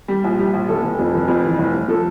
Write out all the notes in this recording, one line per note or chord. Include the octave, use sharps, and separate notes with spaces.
G3
A#1
G3
A#1
F1 A4
F1
F2
F1
F2
E3
F1
F1
F3 A4